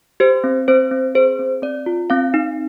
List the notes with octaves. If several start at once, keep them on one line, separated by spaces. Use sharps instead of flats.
G4 C5
C4
C4 C5
C4
G#4 C5
C4
C4 D5
F4
C4 F5
D#4